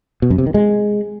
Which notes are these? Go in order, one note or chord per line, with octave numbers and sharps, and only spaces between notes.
B2
F#2
C3
D#3
G#3